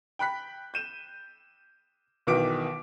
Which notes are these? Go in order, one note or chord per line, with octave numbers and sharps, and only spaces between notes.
G5 B5 F#6 B6
G6 D#7 E7
B1 B2 D#3 E3 D6 D7